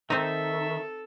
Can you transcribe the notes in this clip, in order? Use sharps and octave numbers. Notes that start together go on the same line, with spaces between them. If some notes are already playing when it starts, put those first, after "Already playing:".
D#3 C4 D#4 A4 E5